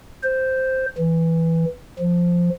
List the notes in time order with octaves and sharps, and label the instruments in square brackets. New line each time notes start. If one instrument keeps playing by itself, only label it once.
[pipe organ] C5
E3
F3